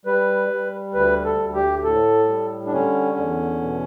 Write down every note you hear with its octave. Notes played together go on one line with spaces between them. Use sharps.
G3 B4
G3
D2 B4
A4
D2
G4
A2 A4
G3
D4
D3 C#4
E2
B2